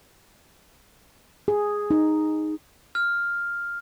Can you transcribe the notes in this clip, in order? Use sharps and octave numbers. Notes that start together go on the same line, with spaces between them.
G#4
D#4
F6